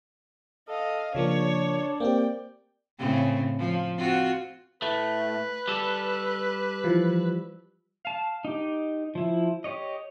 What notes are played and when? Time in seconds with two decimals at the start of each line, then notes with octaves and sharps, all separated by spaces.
0.68 A4 D#5 F5
1.15 C#3 F3 A#3 D4 C#5
2.00 A#3 C4 G4 D5 G5
2.99 A2 C#3 C4
3.59 F3
3.97 C4 F4 F#4
4.82 A2 A3 B4
5.68 G3 A4
6.84 E3 F3
8.05 F5 A5
8.45 D#4 G4
9.15 F3 E4
9.64 G4 C#5 D#5